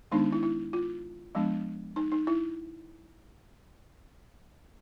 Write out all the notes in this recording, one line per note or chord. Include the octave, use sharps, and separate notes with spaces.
D#3 G#3 B3 D4 D#4
E4
E4
F4
F3 G#3 B3 D4
D#4
D#4
E4